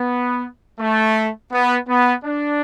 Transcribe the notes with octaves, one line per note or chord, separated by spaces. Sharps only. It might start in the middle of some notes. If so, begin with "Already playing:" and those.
Already playing: B3
A3
B3
B3
D4